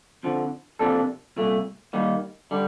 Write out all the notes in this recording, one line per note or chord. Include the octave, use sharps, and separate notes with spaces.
F2 D3 F3
C3 F3 A#3 D4 A4
C2 A#2 A3
D#2 D#3 G3 A#3
D3 G3